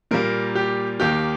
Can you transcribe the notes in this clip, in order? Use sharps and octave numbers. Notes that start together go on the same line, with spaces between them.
A#2 G3 A#3 A#4
G4
D#2 D#3 A#3 G4